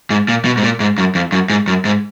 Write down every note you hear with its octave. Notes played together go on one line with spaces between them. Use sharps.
G#2
A#2
B2
G#2
A#2
G#2
F#2
F2
F#2
G#2
F#2
G#2